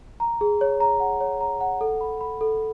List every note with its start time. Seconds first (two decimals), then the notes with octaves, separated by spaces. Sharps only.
0.20 A#5
0.41 G#4
0.61 C#5
0.80 A#5
1.00 F#5
1.21 C#5
1.41 A#5
1.61 F#5
1.81 A4
2.01 B5
2.21 B5
2.41 A4